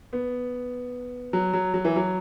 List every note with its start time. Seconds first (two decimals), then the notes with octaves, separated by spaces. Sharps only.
0.13 B3
1.33 F#3
1.53 F#3
1.74 F#3
1.85 E3
1.96 F#3